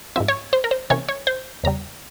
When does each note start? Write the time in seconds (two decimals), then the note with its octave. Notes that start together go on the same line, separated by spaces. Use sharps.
0.16 G#2 F3 C4 E5
0.28 C#5
0.53 C5
0.64 A#4
0.71 C5
0.90 C3 E3 A#3 C#4 C#5
1.09 C#5
1.27 C5
1.64 E2 C#3 G3 A#5